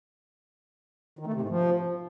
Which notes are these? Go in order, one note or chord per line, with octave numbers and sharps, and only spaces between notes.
D#3
A3
C3
G#2
F3